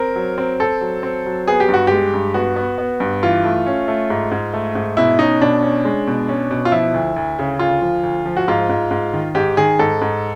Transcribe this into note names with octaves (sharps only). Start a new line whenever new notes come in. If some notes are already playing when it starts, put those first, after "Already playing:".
Already playing: C4 A#4
F#3
C4
C4 A4
F#3
C4
F#3
B3 G#4
G4
G2 F#4
G#3 G4
G2
B3 F#4
B3
B3
G2
E3 F4
A3
C#4
A3
G#2
G#2
A3
G#2
B2 E4
C#4 D#4
B2 D4
C#4
G#3
B2
C#4
B2
F4
F3 E4
D2
D2
C#3
D2 F4
F3
D2
F3
F#4
G#2 F4
G#2
G#2
D#3
G#2 G4
D#3 G#4
G#2 A4
G#2